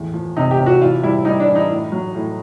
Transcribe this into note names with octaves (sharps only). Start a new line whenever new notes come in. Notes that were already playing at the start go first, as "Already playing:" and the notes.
Already playing: E2 A2
F3
C3 D#4
G4
C3
F#4
E3 F4
G3 E4
G3 D#4
D4
E3
D#4
A2
F#3
A2